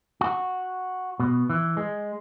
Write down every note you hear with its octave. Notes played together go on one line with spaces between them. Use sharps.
F#4
B2
E3
G#3